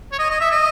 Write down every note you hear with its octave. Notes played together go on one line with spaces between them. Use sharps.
C#5
D#5
D#5
E5
D#5